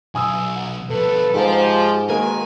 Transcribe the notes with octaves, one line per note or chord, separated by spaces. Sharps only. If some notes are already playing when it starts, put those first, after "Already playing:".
B1 G#5 D#6 E6
F#5
B2 F3 A4 B4
G#2 F3 G4
B2 D#3 G#3 A#3 A#4 G#5